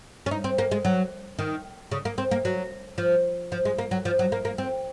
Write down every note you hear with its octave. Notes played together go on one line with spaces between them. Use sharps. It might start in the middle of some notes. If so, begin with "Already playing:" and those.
C#4
D#4
C4
A#3
G#3
F#3
D#3
C#3
A#3
C4
A#3
F#3
F3
F3
G#3
A#3
F#3
F3
F#3
A#3
A#3
C4